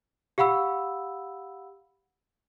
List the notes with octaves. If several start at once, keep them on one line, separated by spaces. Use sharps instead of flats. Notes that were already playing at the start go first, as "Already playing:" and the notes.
G4 F5 F#5 B5 E6